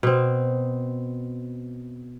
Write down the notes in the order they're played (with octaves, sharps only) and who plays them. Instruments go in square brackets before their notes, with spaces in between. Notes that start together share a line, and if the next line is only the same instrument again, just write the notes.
[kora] B2 C4